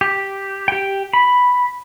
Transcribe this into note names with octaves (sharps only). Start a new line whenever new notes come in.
G4
G4 G5
B5